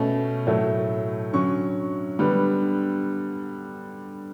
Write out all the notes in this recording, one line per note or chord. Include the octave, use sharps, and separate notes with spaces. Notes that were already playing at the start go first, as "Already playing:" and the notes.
Already playing: B2 A3 C#4
A2 F#3 A3
D3 F#3 C#4 C#6
D3 G3 B3